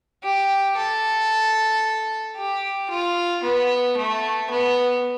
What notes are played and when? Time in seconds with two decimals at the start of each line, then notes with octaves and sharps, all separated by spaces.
0.23 G4
0.77 A4
2.37 G4
2.90 F4
3.43 B3
3.97 A3
4.50 B3